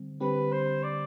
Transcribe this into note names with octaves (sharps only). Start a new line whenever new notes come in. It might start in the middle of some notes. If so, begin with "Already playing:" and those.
Already playing: D3 G3 C4
D3 G3 C4 G4 B4
C5
D5